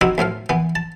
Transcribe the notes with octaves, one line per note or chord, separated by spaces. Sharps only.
C4 D#4 E4 F#4
B1 A2 F3 F5
E3 B3
A5